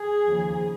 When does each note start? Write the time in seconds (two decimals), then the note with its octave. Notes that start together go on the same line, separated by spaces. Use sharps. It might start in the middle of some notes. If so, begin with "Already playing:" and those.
Already playing: G#4
0.26 D#2 C#3 F3